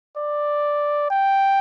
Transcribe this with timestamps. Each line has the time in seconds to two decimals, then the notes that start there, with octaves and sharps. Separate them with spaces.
0.17 D5
1.11 G5